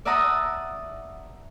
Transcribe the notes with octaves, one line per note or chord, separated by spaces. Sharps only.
D5 E5 F#5 A5 A#5 D#6